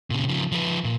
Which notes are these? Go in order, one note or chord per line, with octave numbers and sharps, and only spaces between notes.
A#2 C#3
C#3 F3
F3 B4
A#2